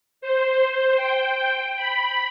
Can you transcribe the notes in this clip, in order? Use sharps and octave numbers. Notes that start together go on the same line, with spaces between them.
C5
G5
B5